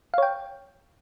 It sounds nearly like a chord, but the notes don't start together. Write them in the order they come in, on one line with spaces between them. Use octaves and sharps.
F5 C#5 G5